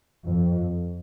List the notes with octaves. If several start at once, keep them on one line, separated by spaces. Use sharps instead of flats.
F2